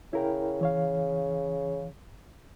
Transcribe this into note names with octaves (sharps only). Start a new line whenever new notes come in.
C#3 E4 A#4 G5
E3 C#5 F5